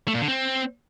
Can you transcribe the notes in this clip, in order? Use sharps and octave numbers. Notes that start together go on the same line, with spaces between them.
A3
A#2
D3
C4